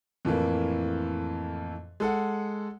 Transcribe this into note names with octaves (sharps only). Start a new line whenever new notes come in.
F2 A2 E3 A#3
G#3 A4 F#5